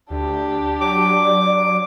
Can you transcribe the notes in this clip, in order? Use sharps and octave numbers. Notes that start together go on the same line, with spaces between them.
D2 D4 G4
F#3 D5 D6